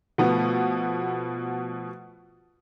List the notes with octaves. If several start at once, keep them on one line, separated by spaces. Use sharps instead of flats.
B2 F3 A3 B3